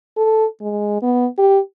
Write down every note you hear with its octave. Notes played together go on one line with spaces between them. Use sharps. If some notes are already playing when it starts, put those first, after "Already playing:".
A4
G#3
B3
G4